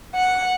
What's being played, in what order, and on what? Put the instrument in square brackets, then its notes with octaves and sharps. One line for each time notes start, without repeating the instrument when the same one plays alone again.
[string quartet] F#5